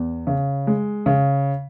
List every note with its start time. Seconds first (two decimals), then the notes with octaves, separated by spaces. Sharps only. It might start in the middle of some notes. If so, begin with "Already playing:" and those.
Already playing: E2
0.27 C#3
0.67 G#3
1.06 C#3